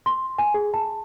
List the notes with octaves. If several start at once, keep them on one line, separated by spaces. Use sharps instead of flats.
C6
G#5
G#4
A5